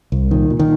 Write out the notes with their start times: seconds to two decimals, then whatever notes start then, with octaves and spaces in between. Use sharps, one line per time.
0.12 C2
0.31 A#2 D#3
0.50 A#2
0.59 D#3